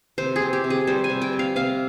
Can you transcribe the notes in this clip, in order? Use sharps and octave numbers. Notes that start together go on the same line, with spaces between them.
C3 C5
G#4
C4
G4
C3
G#4
G3 C5
G#5
C3
G5
C4
F5
C3 F5